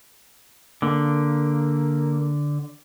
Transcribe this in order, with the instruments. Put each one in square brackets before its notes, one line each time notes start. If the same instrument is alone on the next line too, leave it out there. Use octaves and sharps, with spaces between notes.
[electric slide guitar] D3 [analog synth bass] A#3